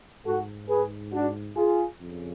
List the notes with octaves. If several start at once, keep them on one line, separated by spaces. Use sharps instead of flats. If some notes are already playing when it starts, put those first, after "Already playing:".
G#2 F#4 A4
G#4 B4
D4 F#4
F4 G#4
F2 C#3